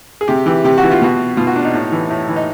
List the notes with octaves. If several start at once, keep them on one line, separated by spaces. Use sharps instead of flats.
G#4
C3 G4
E3 G4
C3 G4
F#4
E3
F4
B2 F#4
B2 F4
F#4
D4
D#4
A2
E3
A2
E3
D#4